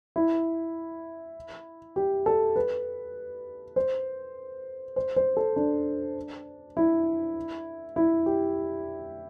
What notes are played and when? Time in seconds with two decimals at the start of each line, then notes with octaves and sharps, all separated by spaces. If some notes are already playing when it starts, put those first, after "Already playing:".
0.16 E4
1.96 G4
2.26 A4
2.56 B4
3.76 C5
4.96 C5
5.16 C5
5.37 A4
5.56 D4
6.77 E4
7.96 E4
8.26 G4